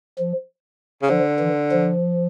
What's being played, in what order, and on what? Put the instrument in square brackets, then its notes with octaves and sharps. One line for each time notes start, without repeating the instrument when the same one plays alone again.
[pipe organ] F3
[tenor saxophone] C#3
[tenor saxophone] D3 [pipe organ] F3
[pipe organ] E3
F3